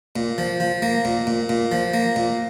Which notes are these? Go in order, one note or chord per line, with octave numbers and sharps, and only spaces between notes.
A#2
F3
F3
A#3
A#2
A#2
A#2
F3
A#3
A#2